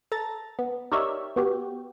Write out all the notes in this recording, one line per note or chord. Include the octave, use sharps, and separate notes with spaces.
A4 A#5 A6
B3
D#4 G4 A#4 C#5 D5 E5
B3 F#4 G4